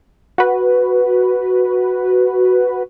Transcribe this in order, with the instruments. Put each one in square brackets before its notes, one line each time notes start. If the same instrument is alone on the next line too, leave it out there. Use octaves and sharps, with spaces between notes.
[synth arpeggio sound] F#4 B4